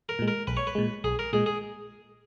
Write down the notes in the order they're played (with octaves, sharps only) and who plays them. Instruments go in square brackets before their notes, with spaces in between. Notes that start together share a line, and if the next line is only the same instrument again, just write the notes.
[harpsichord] A#4
[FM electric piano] A#2 G#3
[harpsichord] A#4
[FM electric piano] B1 [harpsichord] B4
[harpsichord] C#5
B4
[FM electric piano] A#2 G#3
[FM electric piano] B1 [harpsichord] G#4
[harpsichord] A#4
[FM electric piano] A#2 G#3 [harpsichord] G#4
[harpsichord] G#4